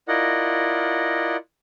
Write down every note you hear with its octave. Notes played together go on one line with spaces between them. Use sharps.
E4 F4 A#4 D5 D#5 F#5